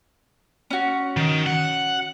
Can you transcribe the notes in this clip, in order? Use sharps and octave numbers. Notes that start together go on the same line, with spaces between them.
C#4 F#4
D#3
F#5